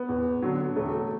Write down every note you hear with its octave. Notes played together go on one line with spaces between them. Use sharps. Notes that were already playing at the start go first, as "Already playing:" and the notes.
Already playing: B3
E2
D3 F#3
E1 A3